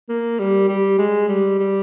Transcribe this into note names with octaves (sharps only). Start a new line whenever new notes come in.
A#3
G3
G3
G#3
G3
G3